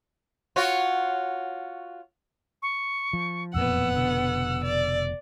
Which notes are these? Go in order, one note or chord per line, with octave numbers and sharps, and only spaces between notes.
F4 F#4 C#5
C#6
F3
E1 F2 A#2 B3 F#5 E6
F1 B2 D3 E6
D5